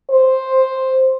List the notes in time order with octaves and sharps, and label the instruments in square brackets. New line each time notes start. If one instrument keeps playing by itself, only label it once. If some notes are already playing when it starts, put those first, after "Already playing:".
[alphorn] C5